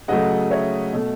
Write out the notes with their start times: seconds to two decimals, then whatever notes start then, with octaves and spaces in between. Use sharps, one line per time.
0.08 C#3 F#3 A3 D#5 F#5
0.51 C#5 E5
0.93 B2 A3